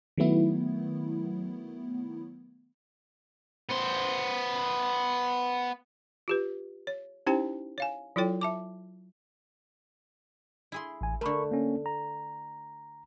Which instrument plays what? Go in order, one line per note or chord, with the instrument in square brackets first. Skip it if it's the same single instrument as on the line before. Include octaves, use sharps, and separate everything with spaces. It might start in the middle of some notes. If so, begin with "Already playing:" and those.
[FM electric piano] D#3 F#3 A3 B3 E4
[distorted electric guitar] B3 C5
[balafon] F4 G4 B4
C#5
C#4 D#4 E4 G4 C5 G5
C#5 F5 G#5
F#3 E4 F4 A4 C#5 G5
E5 A5 D6
[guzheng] E4 G#4 C6
[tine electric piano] A1 G#5
[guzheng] D3 A3 [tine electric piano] A#4 B5 C#6
[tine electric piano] A#3 C#4
A#5